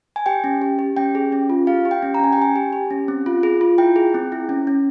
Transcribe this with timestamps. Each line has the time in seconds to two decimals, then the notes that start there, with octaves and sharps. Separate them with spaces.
0.16 G#5
0.26 G4 G5
0.44 C#4
0.62 G4
0.79 G4
0.97 C#4 G5
1.15 G#4
1.32 C#4
1.50 F4
1.67 G4 F5
1.85 G4
1.91 G5
2.02 C#4
2.14 A#5
2.20 C#4 G#5
2.33 G5
2.38 G4 G#5
2.56 G4
2.73 G4
2.91 C#4
3.08 C4
3.26 F4
3.43 G#4
3.61 F4
3.78 E4 G5
3.96 G#4
4.14 C4
4.32 E4
4.49 C#4
4.67 C#4